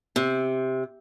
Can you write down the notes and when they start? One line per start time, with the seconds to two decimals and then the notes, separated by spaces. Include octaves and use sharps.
0.16 C3